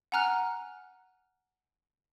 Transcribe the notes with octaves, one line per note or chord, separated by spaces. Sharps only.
F#5 G#5 A#5 F6 F#6